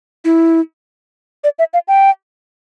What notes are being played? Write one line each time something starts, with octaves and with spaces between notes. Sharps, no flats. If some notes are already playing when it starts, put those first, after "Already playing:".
E4
D5
E5
F5
G5